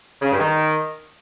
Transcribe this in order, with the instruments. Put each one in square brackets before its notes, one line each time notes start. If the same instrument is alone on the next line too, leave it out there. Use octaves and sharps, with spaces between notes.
[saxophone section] C#3
G2
D#3